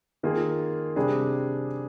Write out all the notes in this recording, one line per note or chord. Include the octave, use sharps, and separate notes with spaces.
D#3 A#3 F4 G#4
C3 G3 D4 G#4